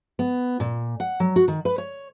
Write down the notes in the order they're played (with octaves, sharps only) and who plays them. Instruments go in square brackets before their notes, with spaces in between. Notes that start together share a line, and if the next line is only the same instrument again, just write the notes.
[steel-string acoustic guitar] B3
A#2
F#5
F#3
F#4
D#3
B4
C#5